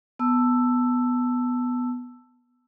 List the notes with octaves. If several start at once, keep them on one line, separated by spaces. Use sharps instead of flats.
B3 A5 E6